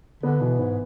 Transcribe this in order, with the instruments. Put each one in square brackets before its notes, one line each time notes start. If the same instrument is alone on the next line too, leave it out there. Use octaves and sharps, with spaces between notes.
[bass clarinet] D3 [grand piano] B3
[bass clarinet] B2 [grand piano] E3
[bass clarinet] G#2 [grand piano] B3